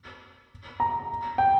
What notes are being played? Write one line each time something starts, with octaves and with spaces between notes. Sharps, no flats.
A#5
G5